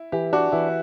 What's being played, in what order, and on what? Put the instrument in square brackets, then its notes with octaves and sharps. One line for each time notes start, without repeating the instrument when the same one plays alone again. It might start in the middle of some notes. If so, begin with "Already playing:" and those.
Already playing: [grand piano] E4
[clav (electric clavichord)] E3 [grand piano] G4
[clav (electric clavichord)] D4 [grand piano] F#4
[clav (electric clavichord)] E3 [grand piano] E4